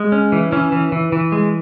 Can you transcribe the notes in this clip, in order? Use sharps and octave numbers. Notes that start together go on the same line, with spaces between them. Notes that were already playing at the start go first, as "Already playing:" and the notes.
Already playing: G#3
C#4
E3
E3 C#4
E3
E3
E3
G#3